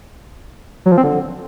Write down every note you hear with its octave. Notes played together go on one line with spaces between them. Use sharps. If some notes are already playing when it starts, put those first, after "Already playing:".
F#3
F3
C4
D3